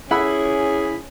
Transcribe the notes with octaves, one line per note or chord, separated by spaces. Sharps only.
C#4 E4 G#4 F#5 B5 E6